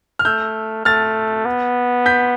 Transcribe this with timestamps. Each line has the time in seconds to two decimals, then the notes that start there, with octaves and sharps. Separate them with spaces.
0.19 F6
0.25 A3 E6 G6
0.85 A3 F6 A6
1.45 B3
2.06 G6 B6